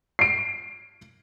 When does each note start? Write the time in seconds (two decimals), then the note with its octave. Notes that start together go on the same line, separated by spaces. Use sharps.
0.19 C7 D7